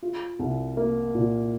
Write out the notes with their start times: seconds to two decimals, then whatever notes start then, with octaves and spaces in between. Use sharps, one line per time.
0.02 F4
0.39 C2
0.77 A#3
1.15 A#2